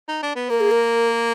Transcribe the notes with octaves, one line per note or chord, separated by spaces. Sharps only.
D#4
D4
B3
A#3 A#4
G#4
A#4